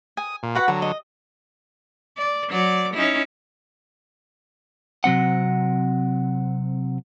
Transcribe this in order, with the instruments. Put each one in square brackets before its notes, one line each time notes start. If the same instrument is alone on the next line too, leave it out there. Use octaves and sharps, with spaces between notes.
[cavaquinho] G#5 [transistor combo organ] D#6
[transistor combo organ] A#2
[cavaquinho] F#4 B4 F#5
[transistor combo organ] D3 F#3 [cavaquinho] A#5
[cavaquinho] D#5
[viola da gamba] D5
F#3 D5
C#4 D#4 E4
[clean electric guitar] C3 F#3 C4 F#5